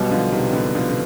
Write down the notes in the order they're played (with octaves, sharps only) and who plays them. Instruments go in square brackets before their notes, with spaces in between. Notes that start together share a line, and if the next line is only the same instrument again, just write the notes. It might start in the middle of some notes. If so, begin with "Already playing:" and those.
Already playing: [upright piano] B1 B2 G3
[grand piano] D3 F3
C3 D#3
B2 D3
D3 F3
D3